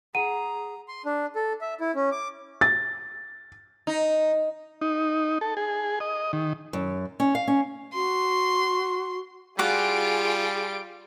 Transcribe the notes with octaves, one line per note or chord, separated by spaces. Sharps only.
G#4 F#5 A#5 D#7
C6
D4
A4
E5
E4
C#4
D6
A6
D#4
D#4
A4
G#4
D#5
D#3
F#2
C#4
F5
C#4
F#4 C6
G3 F4 F#4 G#4 D6 D7